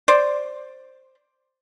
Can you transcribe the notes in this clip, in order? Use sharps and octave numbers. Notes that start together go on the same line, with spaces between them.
C5 D5